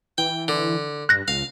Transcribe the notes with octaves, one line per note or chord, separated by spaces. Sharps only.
E3 G5
D3
G2 F#6 A#6
C#2 F5